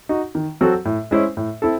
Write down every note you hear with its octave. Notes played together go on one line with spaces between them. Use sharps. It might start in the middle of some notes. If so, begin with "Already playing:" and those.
D#4 F#4
D#3
F#3 C4 F#4 A4
A2
G#3 C#4 E4 C5
A2
C4 E4 A4